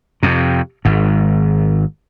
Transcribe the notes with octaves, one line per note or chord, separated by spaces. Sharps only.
F2 C3
G#1 G#2